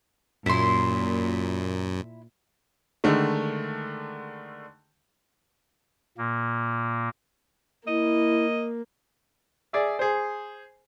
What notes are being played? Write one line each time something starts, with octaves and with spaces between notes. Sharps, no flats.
F#2 A#2 E4 C6
D3 D#3 G#3 A3
A#2 A#3
A#3 E4 D#5
G#4 D5 E5
G#4 C5